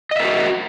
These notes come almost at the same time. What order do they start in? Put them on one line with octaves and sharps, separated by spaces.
D#5 E5 A#4 F#4